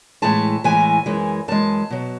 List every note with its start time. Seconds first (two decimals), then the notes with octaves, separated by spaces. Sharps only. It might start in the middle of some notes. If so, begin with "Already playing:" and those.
0.22 A2 E3 G#3 A5
0.64 A2 E3 G#3 G#5
1.06 F#2 E3 G#3
1.48 F#2 E3 G#3 A5
1.90 B2 F#3